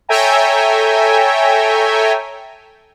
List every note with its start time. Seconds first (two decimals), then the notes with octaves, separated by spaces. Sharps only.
0.09 A4 C#5 E5 G5 G#5 A#5